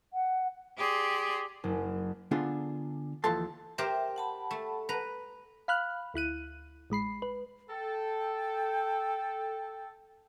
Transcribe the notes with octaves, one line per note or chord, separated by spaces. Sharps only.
F#5
G4 G#4 D5 C6
F#1
D3 B3 D4 F4 G#4
D#2 E3 F3 A4 A5 C6
G4 A#4 C5 E5 G5
F#5 A5 B5
A3
B4 A#5
F5 B5 F6 F#6
D2 E4 F#6 D#7
A1 G#3 B5 C7
B4
A4 G5